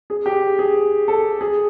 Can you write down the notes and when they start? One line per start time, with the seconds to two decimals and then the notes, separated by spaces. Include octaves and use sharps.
0.10 G#4
0.26 G4
0.59 G#4
1.08 A4
1.41 G#4